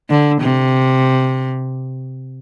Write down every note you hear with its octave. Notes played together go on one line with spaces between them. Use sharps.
D3
C3